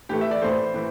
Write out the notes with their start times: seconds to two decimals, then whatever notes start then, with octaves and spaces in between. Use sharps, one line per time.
0.09 A2 E3 A3 G4
0.21 E5
0.31 D5
0.42 A2 E3 A3 C5
0.74 A2 E3